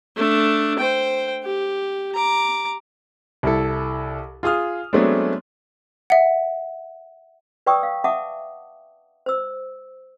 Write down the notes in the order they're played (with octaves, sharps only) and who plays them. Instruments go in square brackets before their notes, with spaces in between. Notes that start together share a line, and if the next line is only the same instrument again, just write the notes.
[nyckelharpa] A3 D4
C5 G5
G4
A#5 D6
[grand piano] C2 E4 A4
F4 G#4 D#6 F6
F#3 G#3 A3 B3 C4 D4
[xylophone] E5 F#5
[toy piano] B4 D5 G5 C#6 D#6 E6
F5
E5 F#5 A5 D6 D#6
C5 E6